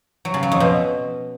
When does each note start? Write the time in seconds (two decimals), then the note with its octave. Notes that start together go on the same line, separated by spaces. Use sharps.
0.25 F#3
0.34 C#3
0.43 F#3
0.52 F2
0.60 B2